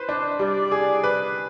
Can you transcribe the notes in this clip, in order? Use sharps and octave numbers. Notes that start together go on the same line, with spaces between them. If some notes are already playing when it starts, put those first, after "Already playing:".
Already playing: B4 C5
D4
G3 D5
G#4
B4